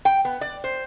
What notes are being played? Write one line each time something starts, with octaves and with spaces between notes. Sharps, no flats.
G5
B3
D5
C5